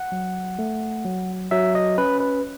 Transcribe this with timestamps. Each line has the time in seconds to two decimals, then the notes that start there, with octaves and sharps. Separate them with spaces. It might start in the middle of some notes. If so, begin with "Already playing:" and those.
Already playing: F#5
0.12 F#3
0.59 A3
1.05 F#3
1.51 F#3 E5
1.75 D#5
1.98 C#4 B4
2.20 B4